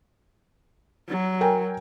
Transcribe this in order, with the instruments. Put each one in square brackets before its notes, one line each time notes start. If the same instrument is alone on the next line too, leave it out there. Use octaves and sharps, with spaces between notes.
[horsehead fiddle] F#3
[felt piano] A#4 G5 G#5